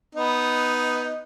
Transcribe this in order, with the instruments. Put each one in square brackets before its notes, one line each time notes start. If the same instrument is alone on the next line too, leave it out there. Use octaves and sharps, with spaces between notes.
[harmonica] B3 D#4